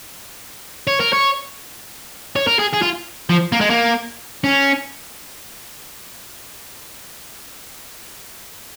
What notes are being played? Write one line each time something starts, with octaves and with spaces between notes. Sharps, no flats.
C#5
A#4
C#5
C#5
A#4
G#4
G#4
F4
F3
A#3
G#3
A#3
C#4